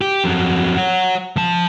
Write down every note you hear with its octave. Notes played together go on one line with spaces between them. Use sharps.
G4
F2 F#3
C#5 F#5
F3 A5